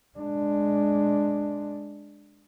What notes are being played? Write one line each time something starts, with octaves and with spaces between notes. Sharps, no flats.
G#3 D4